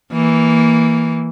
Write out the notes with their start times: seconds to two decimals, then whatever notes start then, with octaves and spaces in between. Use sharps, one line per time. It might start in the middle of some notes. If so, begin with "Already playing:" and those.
0.13 E3 A#3